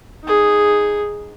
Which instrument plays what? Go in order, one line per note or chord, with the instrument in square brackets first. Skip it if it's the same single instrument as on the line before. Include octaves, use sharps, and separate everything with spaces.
[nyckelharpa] D#4 G#4